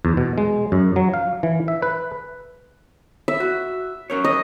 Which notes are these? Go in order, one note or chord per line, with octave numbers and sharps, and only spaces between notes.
E2
B2
G#3
F#2
F#3
F5
E3
E5
B4
E5
F#4
C#4 A#4 C#5
D#5